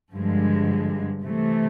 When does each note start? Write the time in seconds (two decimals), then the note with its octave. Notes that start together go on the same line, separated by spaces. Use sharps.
0.14 G2 D3 F3 G#3
1.23 C3 E3 A3